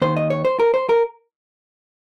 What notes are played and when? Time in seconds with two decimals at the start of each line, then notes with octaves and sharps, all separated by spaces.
0.02 D#2 D#3 C5
0.17 D#5
0.30 C#5
0.45 C5
0.60 A#4
0.74 C5
0.89 A#4